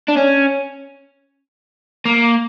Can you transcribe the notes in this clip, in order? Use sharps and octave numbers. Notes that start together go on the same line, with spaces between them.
D4
C#4
A#3